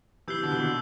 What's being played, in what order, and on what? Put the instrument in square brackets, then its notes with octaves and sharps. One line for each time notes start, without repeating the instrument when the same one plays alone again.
[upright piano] C3 E3 [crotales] E6 G6 C7 G7
[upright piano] B2 D3
E3
B2 D3